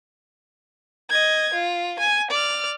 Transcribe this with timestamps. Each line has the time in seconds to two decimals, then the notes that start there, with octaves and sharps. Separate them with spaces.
1.10 D#5 G#6
1.54 F4
1.99 G#5
2.30 D5 F6